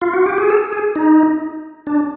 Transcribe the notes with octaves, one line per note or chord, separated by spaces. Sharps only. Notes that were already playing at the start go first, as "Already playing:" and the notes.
F4
F#4
G4
G#4
A4
G#4
D#4
D4